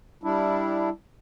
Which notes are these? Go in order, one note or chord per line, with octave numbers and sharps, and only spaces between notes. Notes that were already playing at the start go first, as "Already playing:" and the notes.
G3 D4 E4